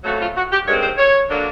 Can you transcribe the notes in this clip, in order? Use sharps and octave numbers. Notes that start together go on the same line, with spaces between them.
F2 C#3 F#3 A3 F#4
F4
F#4
G4
G2 D#3 G#3 C4 C#5
C5
C#5
D3 F#3 A#3 D4